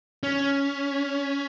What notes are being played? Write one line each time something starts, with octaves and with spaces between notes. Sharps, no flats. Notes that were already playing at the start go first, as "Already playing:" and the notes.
C#4